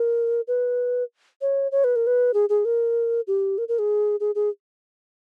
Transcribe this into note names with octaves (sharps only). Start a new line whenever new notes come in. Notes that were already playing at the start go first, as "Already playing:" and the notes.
Already playing: A#4
B4
C#5
C#5
B4
A#4
B4
G#4
G#4
A#4
G4
A#4
A#4
G#4
G#4
G#4